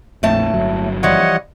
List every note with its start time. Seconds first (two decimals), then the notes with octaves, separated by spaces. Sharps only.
0.23 A#1 F2 A2 A3 A5
0.54 G1 F#3
1.03 E3 F3 G3 C#5 D#5 F#5